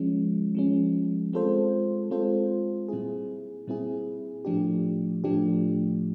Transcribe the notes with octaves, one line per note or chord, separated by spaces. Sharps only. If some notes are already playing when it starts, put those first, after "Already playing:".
Already playing: F3 G#3 C#4
F3 G#3 C#4
G#3 C4 F4 A4 C5
G#3 C4 F4 A4 C5
A#2 G3 C4 E4 G#4
A#2 G3 C4 E4 G#4
A2 F3 A3 D4 G4
A2 F3 A3 D4 G4